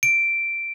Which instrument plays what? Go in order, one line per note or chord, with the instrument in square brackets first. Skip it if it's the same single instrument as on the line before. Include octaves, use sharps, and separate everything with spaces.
[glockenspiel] D7